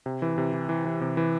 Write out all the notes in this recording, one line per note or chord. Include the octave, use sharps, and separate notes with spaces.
C3
E3
C3
E3
E3
E3
C3
E3